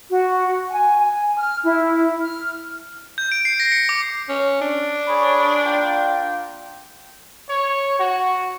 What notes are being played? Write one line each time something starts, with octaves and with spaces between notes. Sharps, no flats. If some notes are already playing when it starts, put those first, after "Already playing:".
F#4
G#5
G#5
F6
E4
F6
G6
D7
C7
A#6
C#7
D6
C#4
D4
G#4 C#5 B5
A#3 F4 G5
C#5
F#4